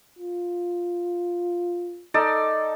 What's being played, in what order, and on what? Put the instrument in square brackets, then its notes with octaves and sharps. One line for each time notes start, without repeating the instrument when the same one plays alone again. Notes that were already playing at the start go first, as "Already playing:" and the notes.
[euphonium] F4
[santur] D#4 A4 D5